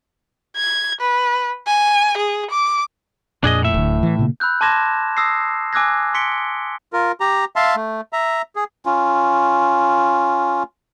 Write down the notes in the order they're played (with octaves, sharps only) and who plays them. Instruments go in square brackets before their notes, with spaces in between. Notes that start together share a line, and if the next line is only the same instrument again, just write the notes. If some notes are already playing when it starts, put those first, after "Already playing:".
[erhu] G#6
B4
G#5
G#4
D6
[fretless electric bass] F2 A#2 [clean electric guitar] D4 G#4 D#5
[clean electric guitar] A2 E5
[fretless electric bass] D1 D3
E3
A#2 C#3 A#3
[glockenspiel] B5 E6 F#6 G6
A5 C6 D6 G#6 A#6 E7
D#6 E6 A#6 C7
G#5 D6 E6 F#6 G#6 A#6
C6 B6 C#7 D7 G7
[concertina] F4 A#4
G4 A#5
E5 F5 A5 C6
A3
E5 A#5
G#4
[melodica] C#4 F4